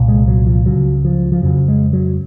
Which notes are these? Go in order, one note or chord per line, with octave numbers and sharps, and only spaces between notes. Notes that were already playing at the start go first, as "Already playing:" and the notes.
Already playing: C2 A#2
G#3
F#3
F3
C#2 C#3 F#3
F3
F3
F2 C#3 F#3
G#3
F#3